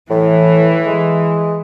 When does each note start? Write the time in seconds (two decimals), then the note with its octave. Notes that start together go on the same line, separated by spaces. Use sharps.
0.10 A2 E3
0.86 G#3